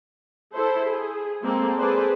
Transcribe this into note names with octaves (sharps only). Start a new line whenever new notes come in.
E4 A4 C5
G#4
G#3 A#3 C4 A4
G#4 A4 B4 C5 D5